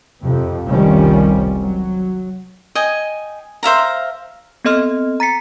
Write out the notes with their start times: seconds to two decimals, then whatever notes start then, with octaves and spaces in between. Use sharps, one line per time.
0.22 F2 C3
0.67 F1 C2 D#3 F3 G3 C#4
1.60 F#3
2.75 D#5 G5 G#5
3.63 C5 E5 F5 A#5
4.65 B3 C4 A4 D#5 C6 F6
5.20 A#5 A6 B6 C#7